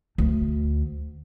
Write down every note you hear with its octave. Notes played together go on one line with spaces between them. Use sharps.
D2